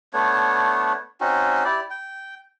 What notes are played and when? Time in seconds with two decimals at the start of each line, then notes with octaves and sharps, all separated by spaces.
0.13 A3 B3 D4 C#5
1.21 C4 C#4 D#4 F#4
1.65 E4 G4 D5
1.90 G5